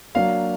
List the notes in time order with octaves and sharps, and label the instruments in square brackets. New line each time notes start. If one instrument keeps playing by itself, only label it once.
[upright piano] F#3 A#3 D4 F5